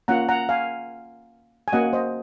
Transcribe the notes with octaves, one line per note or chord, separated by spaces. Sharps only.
A#3 C#4 F4 F#5 A#5
F#5 A#5
F5 G#5
G#5
A#3 C#4 F#4 D#5 F#5
C5 D#5